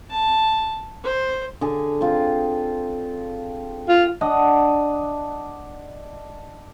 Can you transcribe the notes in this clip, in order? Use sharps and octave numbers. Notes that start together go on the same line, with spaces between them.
A5
C5
D3 G#4
C4 F4
F4
D4 D#5 F#5